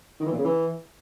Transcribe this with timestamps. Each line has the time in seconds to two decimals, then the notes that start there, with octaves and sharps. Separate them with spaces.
0.20 D#3
0.26 E3
0.32 A#2
0.38 C#3
0.44 E3